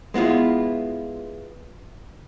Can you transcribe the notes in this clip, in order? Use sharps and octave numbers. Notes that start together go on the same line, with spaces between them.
G#3 B3 E4 F4